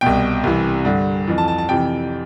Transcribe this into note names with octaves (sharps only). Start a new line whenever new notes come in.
C2 B2 G5
C2 C3 E3
G2 D3
F2 E3
A5
A5
A5
F2 C3 E3 G5